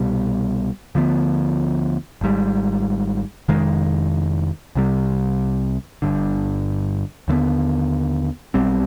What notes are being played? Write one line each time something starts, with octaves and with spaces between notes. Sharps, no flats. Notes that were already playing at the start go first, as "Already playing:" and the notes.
Already playing: C2 B2 G3
D2 D3 F3 B3
G#1 G#2 G3
F1 F2 D#3 G#3
C2 C3 G3
G1 G2 D3
D#2 D3 F3 B3
B1 B2 G3 C4